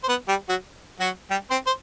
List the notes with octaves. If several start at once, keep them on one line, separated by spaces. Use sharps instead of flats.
C5
B3 B4
G3 G4
F#3 F#4
F#3 F#4
G3 G4
C4 C5
C5